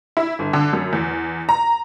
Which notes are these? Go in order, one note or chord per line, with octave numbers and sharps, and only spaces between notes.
E4
G1
D3
F#2
E2
A#5